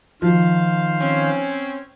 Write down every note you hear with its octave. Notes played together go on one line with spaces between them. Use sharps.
D#3 F3 C5 F5
C4 C#4